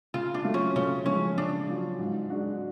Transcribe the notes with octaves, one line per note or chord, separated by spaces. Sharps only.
C#3 F4
D4
F#3 A3 F4
C#4
C#3 C#4
F3 G#3 C#4
C#3 D4
F#3 C#4 F4
G#2
G#3 D4 F#4